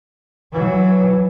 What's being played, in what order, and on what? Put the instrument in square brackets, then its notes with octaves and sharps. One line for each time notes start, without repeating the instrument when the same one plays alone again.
[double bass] E3 F#3